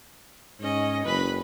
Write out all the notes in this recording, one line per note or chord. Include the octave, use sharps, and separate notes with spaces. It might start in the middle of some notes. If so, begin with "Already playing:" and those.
G#2 C#4 D#5
F#1 B4 B5